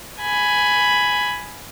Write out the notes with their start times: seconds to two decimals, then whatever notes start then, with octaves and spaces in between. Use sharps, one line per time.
0.20 G#5 B5